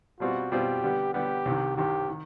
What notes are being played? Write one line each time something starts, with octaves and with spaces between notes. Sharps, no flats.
B2 G3 C4 F4 F#4
B2 G3 C4 F4 G4
D3 G3 B3
D3 G3 B3 G4
C2 C3 D#3
C2 C3 D#3 G4
D#3